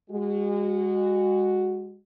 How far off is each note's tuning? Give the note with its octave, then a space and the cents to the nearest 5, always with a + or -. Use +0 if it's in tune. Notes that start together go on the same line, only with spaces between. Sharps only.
G#3 -30 F#4 +0